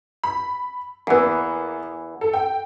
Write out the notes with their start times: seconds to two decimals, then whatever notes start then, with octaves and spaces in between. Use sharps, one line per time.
0.24 B5
1.07 E2 E3 A#3 B3
2.21 A4
2.34 G5